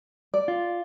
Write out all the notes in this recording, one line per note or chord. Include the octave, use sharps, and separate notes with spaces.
D5
F4